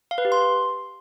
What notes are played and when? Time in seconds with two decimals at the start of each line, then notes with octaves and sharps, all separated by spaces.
0.11 F5
0.18 B4
0.25 G4
0.32 C6